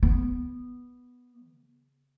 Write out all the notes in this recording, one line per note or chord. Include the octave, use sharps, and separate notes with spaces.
B3
C#3